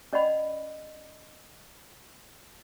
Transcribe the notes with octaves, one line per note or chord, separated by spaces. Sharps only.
C#4 D5 D#5 F#5 B5